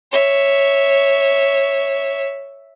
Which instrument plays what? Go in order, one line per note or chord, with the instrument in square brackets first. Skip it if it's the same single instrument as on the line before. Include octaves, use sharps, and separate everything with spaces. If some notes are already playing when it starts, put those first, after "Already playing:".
[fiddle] C#5 E5